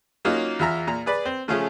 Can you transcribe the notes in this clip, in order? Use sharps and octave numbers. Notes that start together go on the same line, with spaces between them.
F#3 A#3 C#4 D#4 F4
E2 F4 E5 A#5 F6
A#2 A#5
G#4 B4 D5 B5
C4
C#3 F3 A3 C#4 F4 G#4